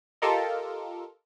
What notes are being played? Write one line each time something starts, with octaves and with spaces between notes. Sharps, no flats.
F4 G4 A4 A#4 D#5